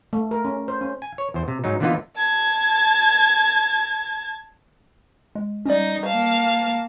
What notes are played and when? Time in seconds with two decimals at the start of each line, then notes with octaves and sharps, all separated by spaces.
0.13 A3
0.31 A#4
0.45 C#4
0.68 C5
0.81 C#4
1.02 G#5
1.18 C#5
1.34 E2 C5
1.48 C3
1.64 G#2 F#3 D#4
1.80 D3 E3 A#3 B3 D#4 F4
2.17 A5 G#6
5.35 G#3
5.66 G3 C#4 D#4 D5
6.06 A#3 F5 A5